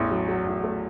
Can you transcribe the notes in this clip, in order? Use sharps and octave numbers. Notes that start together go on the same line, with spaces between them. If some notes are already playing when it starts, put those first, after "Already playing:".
Already playing: A1 E2
F#3
F#3
A1
A3